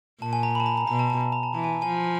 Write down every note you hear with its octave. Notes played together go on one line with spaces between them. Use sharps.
A#2 A5
G#5
A#5
B5
A5
A#5
A#5
B2 A#5
A5
A5
A5
A#5
A5
E3 A5
G#5
G#5
F3